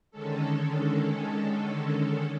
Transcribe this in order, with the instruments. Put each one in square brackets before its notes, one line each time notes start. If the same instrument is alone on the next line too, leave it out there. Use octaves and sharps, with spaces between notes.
[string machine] D3 D#3 G#3 C#4 A4